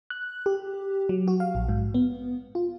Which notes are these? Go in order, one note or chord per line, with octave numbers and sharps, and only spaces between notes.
F#6
G4
F#3
F#4
F5
A#1
G#2
B3
F4